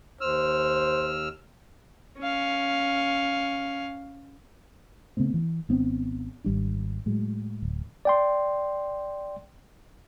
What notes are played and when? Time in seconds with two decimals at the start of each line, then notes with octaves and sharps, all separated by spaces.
0.21 D#2 C5 E6 F6
2.19 C#4 F5
5.17 C#3 A3 B3 C4
5.34 E3
5.69 G#1 B3 C4 D4
6.44 G#1 G3 D4
7.06 A2 F#3 G#3
7.62 D1
8.05 D5 G5 C6